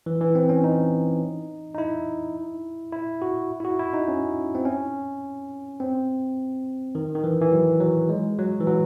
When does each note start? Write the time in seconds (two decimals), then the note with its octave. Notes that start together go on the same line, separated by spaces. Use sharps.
0.06 E3
0.21 E3
0.35 C4
0.49 C#4
0.64 D#4
1.74 D#4
1.78 E4
2.92 E4
3.22 F#4
3.60 E4
3.65 F#4
3.79 E4
3.93 D#4
4.08 C#4
4.55 C4
4.65 C#4
5.80 C4
6.95 D#3
7.15 D#3
7.24 E3
7.41 E3
7.52 F#3
7.80 F#3
8.09 G#3
8.38 F#3
8.61 E3
8.67 F#3